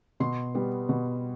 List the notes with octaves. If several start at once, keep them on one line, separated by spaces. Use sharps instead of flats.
B2 C6
G3 B3
B2